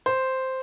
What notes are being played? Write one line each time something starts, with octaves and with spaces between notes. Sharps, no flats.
C5